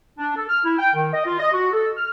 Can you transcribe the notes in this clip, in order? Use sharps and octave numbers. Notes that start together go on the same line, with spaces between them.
D4
A4
F6
E4
G5
D#3
D#5
F4
D#5
F#4
A4
F6